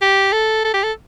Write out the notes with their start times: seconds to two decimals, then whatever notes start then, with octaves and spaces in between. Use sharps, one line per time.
0.01 G4
0.32 A4
0.64 A4
0.74 G4
0.83 A4